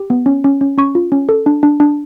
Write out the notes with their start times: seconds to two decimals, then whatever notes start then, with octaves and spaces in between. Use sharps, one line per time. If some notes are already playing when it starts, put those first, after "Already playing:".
Already playing: G4
0.10 B3
0.26 C#4
0.44 C#4
0.61 C#4
0.78 C#4 C#6
0.95 F4
1.12 C#4
1.29 A4
1.46 D4
1.63 D4
1.80 D4